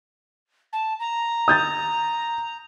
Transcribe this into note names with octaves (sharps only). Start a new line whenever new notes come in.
A5
A#5
D#6 G6 A6